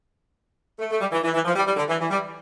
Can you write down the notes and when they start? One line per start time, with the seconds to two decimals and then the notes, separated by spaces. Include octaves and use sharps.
0.79 A3
0.90 A3
1.01 G3
1.12 E3
1.23 E3
1.34 E3
1.45 F3
1.55 G3
1.67 G3
1.77 D3
1.88 E3
2.00 E3
2.10 G3